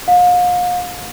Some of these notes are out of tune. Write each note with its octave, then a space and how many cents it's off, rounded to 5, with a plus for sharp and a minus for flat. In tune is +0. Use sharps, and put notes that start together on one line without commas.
F5 +40